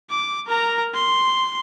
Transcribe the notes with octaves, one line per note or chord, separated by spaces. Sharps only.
D6
A#4 A#5
C6